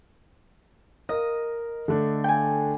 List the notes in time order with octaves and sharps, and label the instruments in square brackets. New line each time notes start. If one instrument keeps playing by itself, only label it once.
[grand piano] A#4 [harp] D#5
[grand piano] D3 A3 D4
[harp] G5 G#5